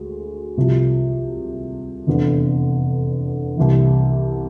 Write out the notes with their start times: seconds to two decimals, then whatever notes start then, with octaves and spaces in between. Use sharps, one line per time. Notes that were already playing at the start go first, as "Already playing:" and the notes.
Already playing: D2 G#3
0.57 C2 C3 F3
2.07 F1 E2 D3
3.57 C2 C3 E3